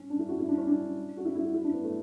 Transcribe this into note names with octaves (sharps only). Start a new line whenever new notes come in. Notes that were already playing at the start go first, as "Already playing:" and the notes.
Already playing: C#4
D4
E4
F#4
E4
D4
C#4
D4
F#4
E4
E4
F#4
E4
D4
B3
A3